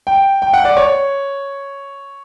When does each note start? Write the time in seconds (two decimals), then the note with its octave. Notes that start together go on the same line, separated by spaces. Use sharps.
0.07 G5
0.42 G5
0.54 F#5
0.65 D5
0.77 C#5